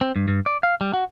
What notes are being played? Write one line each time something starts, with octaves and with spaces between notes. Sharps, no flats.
C4
G2
G2
D5
F5
G3
F#4